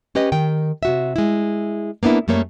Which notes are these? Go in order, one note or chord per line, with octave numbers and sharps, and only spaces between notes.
C#4 G4 B4 D#5
D#3 G5
C3 F#4 E5
G#3 E4
A#3 B3 D4 E4
F#2 G3 A3 A#3 C#5